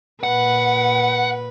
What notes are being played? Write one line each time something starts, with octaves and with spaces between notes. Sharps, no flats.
A#2 B4 F#5